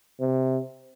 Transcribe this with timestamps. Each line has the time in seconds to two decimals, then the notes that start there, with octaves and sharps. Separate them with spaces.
0.20 C3